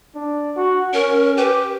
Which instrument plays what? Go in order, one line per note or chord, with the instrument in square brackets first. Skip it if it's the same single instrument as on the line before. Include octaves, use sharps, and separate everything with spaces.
[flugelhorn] D4
F#4
[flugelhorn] C#4 [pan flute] A#4
[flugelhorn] G4 [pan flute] B4